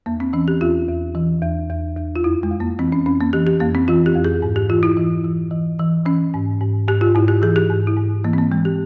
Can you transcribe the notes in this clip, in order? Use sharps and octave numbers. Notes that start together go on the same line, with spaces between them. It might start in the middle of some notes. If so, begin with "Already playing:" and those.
E2 A#3
C4
E3 C#4
G4
E2 F4
E2
E3
E2
E2
E2
F4
F2 E4
G#3
F2
A#3
E3 C4
C#4
F2 C#4
A#3
E3 G4
G4
F2 A#3
C4
E3 F4
G4
F2
G#4
G#2
G4
E3 F4
E4
E3
E3
E3
E3
E3 C#4
G#2
G#2
G#2 G4
F4
G#2 E4
G4
E3 G#4
G4
G#2
E4
G#2
E3 A#3
C4
A#3
E3 G#3
G4